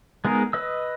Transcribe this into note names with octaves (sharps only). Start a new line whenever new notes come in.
G#3 B3 D#4 G#4 A#4
B4 D#5 E6